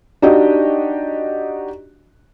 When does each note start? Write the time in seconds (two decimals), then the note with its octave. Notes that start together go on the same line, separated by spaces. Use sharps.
0.22 D4 D#4 F#4 G4 D#5